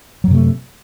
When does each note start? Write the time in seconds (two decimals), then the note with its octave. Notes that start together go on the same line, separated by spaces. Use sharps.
0.24 F#3
0.27 F#2
0.31 C3
0.34 A3